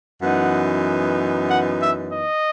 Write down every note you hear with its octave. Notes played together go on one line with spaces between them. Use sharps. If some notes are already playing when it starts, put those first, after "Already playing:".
F#2 E3 B3 D#4 F#5
F#5
E5
D#5